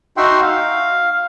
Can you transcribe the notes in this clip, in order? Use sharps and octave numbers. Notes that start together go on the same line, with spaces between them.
D#4 F#4 E5 F#5 G5 C6
F5